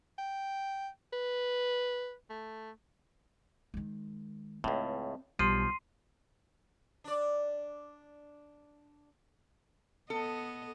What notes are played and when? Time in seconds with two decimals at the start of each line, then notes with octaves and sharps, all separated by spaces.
0.18 G5
1.13 B4
2.30 A3
3.74 D#3 G#3
4.64 C#2 A2 C4
5.39 B1 F3 G3 C6 C7 D#7
7.04 D4 D5
10.10 B3 A4 D#5